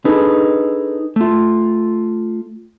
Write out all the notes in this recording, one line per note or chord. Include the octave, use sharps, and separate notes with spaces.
D4 D#4 G#4 A4 B4
A3 F4